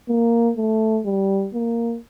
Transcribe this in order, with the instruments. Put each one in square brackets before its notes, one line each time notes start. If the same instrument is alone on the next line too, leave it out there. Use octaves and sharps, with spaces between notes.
[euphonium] A#3
A3
G3
A#3